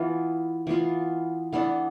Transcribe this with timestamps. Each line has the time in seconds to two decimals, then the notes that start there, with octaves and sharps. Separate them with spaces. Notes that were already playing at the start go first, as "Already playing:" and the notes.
Already playing: E3 B3 F4
0.67 E3 B3 F4
1.53 E3 B3 D4 A4